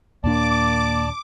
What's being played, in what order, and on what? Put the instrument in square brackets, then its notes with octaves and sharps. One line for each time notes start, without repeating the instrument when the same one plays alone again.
[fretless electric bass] D#2 A#2 D4 [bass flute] A#3 [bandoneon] D5 A5 [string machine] D6